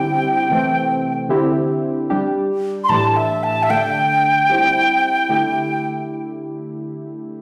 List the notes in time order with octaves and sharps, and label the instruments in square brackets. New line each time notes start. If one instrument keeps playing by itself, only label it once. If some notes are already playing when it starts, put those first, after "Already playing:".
Already playing: [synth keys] D3 G3 C4 E4 G4 [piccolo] G5
[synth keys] C3 E3 A3 C4
D3 C4 E4 G4
G3 D4 G4
[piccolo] C6
[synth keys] A2 E3 A3 D4 G4 [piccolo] A5
[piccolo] E5
A5
E5
[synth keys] D3 A3 D4 [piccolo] G5
[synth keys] G3 C4 E4
D3 A3 E4 G4